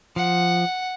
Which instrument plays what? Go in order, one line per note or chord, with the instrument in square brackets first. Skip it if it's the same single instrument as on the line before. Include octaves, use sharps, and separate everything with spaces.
[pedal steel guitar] F3 [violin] F#5